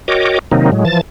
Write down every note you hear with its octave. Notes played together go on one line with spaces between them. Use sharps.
F#4 A#4 C#5 D#5 G5 D6
C3 D#3 F#3 A#3 C4 D#4
A2 F#3 G#3
E3 F3 A5 A6